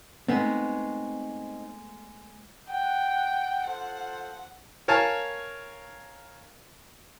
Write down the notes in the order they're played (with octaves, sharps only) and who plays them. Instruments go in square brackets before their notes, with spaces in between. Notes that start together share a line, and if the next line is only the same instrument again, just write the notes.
[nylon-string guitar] G#3 A3 B3 [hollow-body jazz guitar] C4 D#4
[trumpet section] F#5 [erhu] G5
[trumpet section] F4 A4 C5 [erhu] F#5
[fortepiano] A#4 C#5 F5 G#5 A5